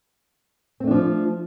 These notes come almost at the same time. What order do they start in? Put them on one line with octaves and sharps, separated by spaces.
C4 A3 D4 F3